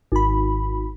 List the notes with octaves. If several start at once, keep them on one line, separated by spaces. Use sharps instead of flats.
G#1 B5